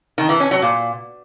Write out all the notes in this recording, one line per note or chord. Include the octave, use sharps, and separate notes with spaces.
D#3
E3
C#4
F#3
A#2